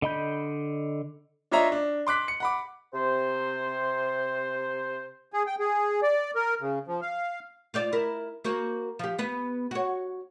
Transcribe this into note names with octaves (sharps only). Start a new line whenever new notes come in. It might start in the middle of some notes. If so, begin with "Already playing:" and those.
D3 D#5 B5 G6
D4 F4 C#5 D#5 E5 A#5
D4
C6 D6 F#6 B6
C#7
F#5 B5 D6
C3 C5
G#4
G5
G#4
D5
A#4
C#3
F3
F5
F4 C5 D5
E4 A#4
A#3 F#4 C5
F3 G4
B3 B4
F#4 C#5